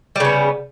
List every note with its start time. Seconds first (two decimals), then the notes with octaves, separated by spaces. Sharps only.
0.16 G3
0.20 C#3
0.25 B3